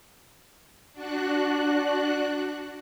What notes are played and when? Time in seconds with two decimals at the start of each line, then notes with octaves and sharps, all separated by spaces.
0.93 D4 F#4 F#6